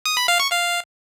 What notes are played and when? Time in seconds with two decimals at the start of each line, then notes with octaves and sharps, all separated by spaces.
0.06 D#6
0.17 B5
0.28 F5
0.40 C#6
0.51 F5